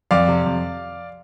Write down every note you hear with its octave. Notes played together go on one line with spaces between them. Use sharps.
F2 D5 F5
C3
F2